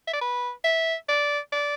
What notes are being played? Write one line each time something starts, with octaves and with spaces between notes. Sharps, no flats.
E5
D5
B4
E5
D5
D5